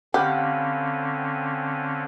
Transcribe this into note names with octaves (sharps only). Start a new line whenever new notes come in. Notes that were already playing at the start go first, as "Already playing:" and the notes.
D3 C4 C#4 G4 F5 F#5 B5